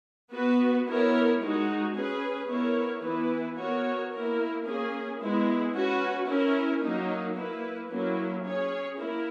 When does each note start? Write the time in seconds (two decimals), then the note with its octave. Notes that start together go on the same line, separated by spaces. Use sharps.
0.32 B3 F#4 B4
0.86 B3 E4 A#4 C#5
1.40 G#3 D#4 F#4
1.94 C#4 G#4 B4
2.48 B3 E4 A#4 C#5
3.02 E3 B3 E4 B4
3.56 B3 F#4 A#4 C#5
4.11 A#3 E4 A#4
4.64 A#3 C#4 G#4
5.19 G#3 B3 E4
5.73 C#4 F#4 B4
6.27 C#4 E4 A#4
6.81 F#3 A#3 D#4
7.35 A#3 E4 B4
7.90 F#3 A#3 C#4 E4
8.44 C#4 G#4 C#5
8.98 A#3 E4 A#4